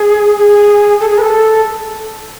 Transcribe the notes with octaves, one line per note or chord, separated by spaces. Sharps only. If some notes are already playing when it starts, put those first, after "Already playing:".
Already playing: G#4
G#4
A4
G#4
B4
A4